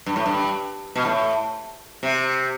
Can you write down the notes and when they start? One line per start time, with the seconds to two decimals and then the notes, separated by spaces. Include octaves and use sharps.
0.06 G2
0.16 A2
0.26 G2
0.95 B2
1.05 A2
2.03 C3